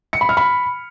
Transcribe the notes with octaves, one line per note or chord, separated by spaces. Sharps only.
C#7
B5
F6
B5